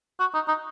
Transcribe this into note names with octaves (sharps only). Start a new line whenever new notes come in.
F#4
D#4
D#4